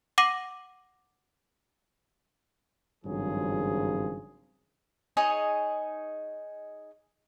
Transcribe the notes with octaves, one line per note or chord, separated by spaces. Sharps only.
F#5 D6 A#6 D#7 F#7
G#1 G2 C#3 F3 F#3 G#4
D#4 G#4 C#5 D#5